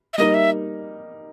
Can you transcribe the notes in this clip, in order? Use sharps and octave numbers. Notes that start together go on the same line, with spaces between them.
E5
G3 A#3 D#4 D#5
E5